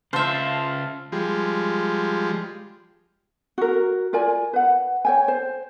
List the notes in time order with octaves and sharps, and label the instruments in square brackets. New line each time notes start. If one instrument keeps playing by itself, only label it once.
[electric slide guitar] C#3 F4 [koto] C5 E5 [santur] F5 A5 C6
[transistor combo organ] F3 G3 G#3
[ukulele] F#4 A#4
F4 A#4 D5 G#5
B4 F#5
C#5 G5 G#5
C5